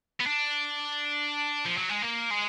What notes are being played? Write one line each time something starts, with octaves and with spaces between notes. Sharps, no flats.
B3
D4
F3
F#3
G#3
A#3
G#3